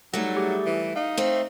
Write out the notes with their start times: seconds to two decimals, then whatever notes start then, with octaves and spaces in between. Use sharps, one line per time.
0.14 F#3 G3 A3 D#4 A#6
0.37 G4 G#4
0.66 E3
0.96 D#4 F5
1.17 A3 C4